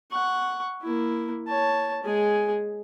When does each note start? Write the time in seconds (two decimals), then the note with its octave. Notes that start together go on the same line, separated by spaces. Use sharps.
0.11 F#5 C#6
0.82 A#3 E4
1.47 C#5 A5
2.04 G#3 G#4